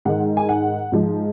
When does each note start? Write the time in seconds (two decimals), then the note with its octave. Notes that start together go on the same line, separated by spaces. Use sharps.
0.05 G#2 D#3 G#3 F#5
0.37 G#5
0.49 F#5
0.92 G#2 F3 G#3